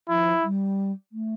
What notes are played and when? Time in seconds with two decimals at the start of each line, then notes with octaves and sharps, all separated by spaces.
0.09 F3 E4
0.43 G3
1.12 A3